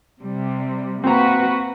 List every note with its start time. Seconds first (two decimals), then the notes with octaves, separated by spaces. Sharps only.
0.21 C3 G3
1.04 A#3 C4 F#4 B4 A#5